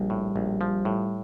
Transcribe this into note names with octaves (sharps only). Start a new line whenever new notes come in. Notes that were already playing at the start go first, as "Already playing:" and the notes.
Already playing: A#1 G3
A2
A#1
F3
A2